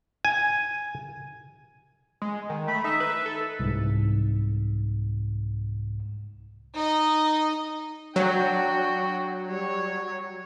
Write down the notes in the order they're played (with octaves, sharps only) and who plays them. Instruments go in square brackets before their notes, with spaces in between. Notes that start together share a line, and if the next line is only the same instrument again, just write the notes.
[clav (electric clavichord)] G#5
[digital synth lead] G#3
D#3
[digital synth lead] A3 [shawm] B5
[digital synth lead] D#4 [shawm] E5
[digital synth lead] B4
A4
[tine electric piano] C2 G#2
[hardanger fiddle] D#4 D#5
[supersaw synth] F#3 [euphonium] D4 [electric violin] F#4 G5
[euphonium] G3 [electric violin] C#5